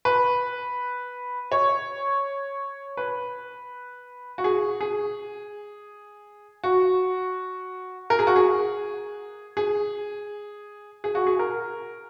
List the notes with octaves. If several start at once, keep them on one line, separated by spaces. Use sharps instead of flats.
B4
C#5
B4
F#4
G#4
G#4
F#4
A#4
G#4
F#4
G#4
G#4
G#4
F#4
G#4
A#4